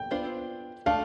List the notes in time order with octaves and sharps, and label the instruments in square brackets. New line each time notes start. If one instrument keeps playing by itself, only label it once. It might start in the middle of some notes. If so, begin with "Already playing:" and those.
Already playing: [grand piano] G5
[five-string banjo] B3 D4 F4 C5
[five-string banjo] A3 D4 A4 [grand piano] F5